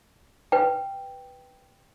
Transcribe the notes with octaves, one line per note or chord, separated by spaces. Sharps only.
B4 G5